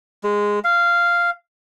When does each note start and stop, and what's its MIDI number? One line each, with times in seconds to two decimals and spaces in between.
0.23 0.59 56
0.64 1.30 77